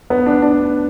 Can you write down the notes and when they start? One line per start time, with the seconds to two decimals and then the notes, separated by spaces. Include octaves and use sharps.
0.10 B3
0.26 D4
0.42 D4